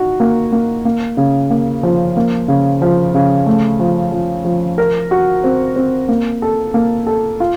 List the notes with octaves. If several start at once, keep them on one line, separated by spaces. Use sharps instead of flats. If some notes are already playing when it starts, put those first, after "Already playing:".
Already playing: D#4 F#4
A#3
A#3
A#3
C#3
A#3
F3
A#3
C#3
F3
C#3
A3
F3
F3
F3
A#4
F#4
C4
C4
A#3
A4
A#3
A4
F4